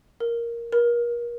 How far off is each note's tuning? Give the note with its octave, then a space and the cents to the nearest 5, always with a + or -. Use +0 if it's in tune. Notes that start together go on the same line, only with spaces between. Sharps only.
A#4 +5
A#4 +35